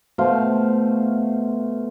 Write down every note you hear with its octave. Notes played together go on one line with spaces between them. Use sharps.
B2 A3 C5 F5